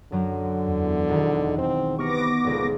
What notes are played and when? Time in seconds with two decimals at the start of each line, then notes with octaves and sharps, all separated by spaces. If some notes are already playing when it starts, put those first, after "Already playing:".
0.12 F#2 D3 F#3
0.67 E2
1.08 E1 D#3
1.58 C4
1.99 C3 B3 C#6 D6 F6 A#6 C#7
2.45 D#1 C#2 A#2